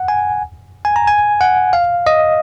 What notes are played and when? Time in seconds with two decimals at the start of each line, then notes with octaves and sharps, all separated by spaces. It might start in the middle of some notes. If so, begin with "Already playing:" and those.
Already playing: F#5
0.08 G#5
0.85 G#5
0.96 A#5
1.07 G#5
1.41 F#5
1.73 F5
2.07 D#5